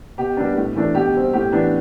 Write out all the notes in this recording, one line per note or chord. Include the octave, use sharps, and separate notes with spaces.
B2 G4
G3 B3 D4
A2
E3 A3 D4
B2 G4
G3 C4
A2 G4
E3 B3 D4